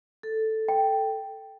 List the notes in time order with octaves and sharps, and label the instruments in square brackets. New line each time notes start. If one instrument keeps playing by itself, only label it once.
[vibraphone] A4
[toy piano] G5